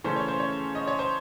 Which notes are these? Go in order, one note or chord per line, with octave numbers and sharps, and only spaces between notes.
C#3 E3 A3 C#4 C5
C#5
C5
C#5
D#5
C#5
C5